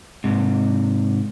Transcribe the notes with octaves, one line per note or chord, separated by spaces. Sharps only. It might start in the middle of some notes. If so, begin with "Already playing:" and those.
G#2 C3